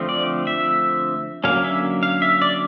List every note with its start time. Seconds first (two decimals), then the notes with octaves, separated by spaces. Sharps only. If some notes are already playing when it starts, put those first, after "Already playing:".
Already playing: D3 F3 A3 C4
0.09 D5
0.47 E5
1.44 D3 F#3 A#3 C#4 F5
1.64 E5
2.03 F5
2.22 E5
2.42 D5